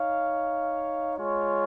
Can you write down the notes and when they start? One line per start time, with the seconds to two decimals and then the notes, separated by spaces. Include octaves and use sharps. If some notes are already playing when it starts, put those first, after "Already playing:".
Already playing: D#4 C#5 F5
1.17 G#3 F4 C#5